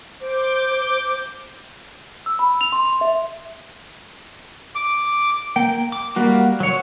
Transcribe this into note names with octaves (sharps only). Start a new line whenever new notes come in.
C5 D6 G6
E6
B5
F7
C6
E5
D6
A#3 G5
D6
G3 A#3 F#4
F#3 C#5